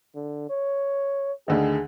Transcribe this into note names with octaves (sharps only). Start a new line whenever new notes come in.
D3
C#5
D2 D3 D#3 G#4